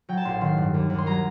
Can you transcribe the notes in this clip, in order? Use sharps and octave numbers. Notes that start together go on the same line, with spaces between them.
F#3 G5
A5
A1 C6
D#3 C6
G2
D#2
D#2
C6
F#3 A#5